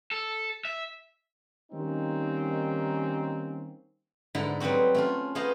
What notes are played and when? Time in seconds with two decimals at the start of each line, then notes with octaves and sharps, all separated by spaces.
0.11 A4
0.65 E5
1.72 D#3 G3 A#3 C4 C#4 D#4
4.35 G#2 D3 E4
4.60 F#3 G3 B3 C4 F#4
4.95 A3 C#4 F4
5.35 A3 B3 G#4 C5 D#5 F5